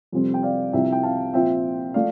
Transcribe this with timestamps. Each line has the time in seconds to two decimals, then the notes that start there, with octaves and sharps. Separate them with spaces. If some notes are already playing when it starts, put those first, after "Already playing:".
0.12 F2 C3 G3 C4
0.34 G5
0.43 D5 F5
0.73 C2 C3 F3 E5 G5
0.92 G5
1.03 F5 A5
1.34 A#2 F3 C4 E5 G5
1.94 F3 A3 D5 F5